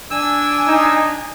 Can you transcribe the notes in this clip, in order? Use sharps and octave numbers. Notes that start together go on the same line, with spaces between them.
D4 G#5 E6
D#4